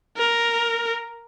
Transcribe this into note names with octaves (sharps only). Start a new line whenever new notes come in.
A#4